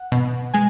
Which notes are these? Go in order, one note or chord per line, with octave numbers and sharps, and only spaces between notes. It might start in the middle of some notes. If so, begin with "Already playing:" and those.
Already playing: F#5
B2
G#3 G#5